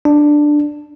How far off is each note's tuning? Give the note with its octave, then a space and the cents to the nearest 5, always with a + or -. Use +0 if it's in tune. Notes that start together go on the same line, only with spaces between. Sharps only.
D4 +10